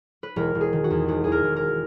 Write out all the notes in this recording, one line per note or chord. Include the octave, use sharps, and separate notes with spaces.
B4
E1 A#4
E1
G#4
D#3
F#4
E2
E1 F#4
E2 G#4
A#4
E2
A#4